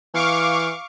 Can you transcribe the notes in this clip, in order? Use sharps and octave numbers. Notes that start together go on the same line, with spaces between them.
E3 F5 C#6 D6